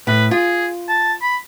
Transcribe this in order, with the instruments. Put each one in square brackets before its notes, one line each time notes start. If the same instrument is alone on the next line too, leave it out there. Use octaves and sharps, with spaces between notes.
[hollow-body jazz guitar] A2 [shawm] B4
[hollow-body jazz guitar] F4 [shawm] G#4
[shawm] A5
B5